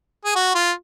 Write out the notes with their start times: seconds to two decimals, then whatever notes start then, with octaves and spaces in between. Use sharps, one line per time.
0.25 G#4
0.35 F#4
0.55 F4